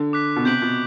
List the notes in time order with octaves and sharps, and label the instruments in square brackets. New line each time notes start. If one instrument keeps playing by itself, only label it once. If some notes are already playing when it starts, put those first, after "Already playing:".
Already playing: [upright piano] D3
[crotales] D6 F#6 B6
[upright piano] B2
[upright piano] C3 [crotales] G6 B6 D7 F#7
[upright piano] B2